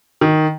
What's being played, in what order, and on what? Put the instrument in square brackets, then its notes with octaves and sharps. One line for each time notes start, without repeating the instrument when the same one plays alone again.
[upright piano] D#3